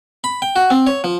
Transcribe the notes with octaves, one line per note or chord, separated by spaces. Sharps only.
B5
G5
F#4
C4
C#5
F3